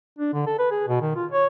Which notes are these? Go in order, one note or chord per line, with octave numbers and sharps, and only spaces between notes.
D4
D3
A4
B4
G#4
B2
D#3
F4
C#5